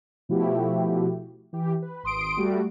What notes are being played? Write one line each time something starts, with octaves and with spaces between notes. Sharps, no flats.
B2 F3 A3 E4 F#4 G4
E3 G4
B4
G#1 C6 D#6 D7
G3 A3 F#4